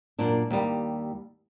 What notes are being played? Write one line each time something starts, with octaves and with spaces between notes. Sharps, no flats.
F#2 A#2 D4
D#2 G3